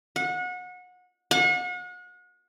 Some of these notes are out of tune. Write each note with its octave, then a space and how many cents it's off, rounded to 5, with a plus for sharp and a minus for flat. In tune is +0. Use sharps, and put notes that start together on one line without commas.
F#5 -30
F#5 -40